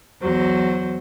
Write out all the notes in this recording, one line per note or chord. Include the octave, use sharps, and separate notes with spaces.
E2 F#3 C5